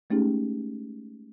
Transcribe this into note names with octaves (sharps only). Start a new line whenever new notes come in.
G#3 A3 C#4 D#4 G4 G#4